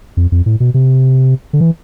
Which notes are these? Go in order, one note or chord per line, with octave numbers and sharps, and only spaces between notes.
F2
F2
A2
B2
C3
D3
E3